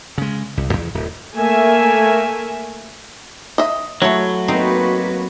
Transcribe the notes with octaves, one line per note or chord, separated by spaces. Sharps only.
C#3 G#3
C2
E2
D1
A3 A#3 A#4 E5 G#5
D#5 E5
F#3 A3 E4 C#5
A#3 C4 D#4 F#4 B4 C5